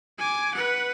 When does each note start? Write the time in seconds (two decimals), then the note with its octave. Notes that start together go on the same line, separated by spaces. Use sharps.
0.19 G#5 D6
0.54 B4 F#5